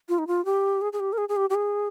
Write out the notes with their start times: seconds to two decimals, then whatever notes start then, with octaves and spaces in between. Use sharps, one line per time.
0.09 F4
0.19 D#4
0.27 F4
0.45 G4
0.82 G#4
0.93 G#4
1.00 G4
1.13 A#4
1.18 G#4
1.29 G#4
1.37 G4
1.50 G4
1.55 G#4